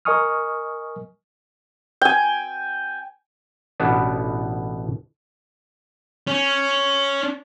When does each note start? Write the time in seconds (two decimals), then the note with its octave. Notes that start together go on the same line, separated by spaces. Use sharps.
0.05 A#4 D#5 G#5 C#6 D#6 F6
2.01 G5 G#5
3.80 A1 B2 B3 D4
6.27 C#4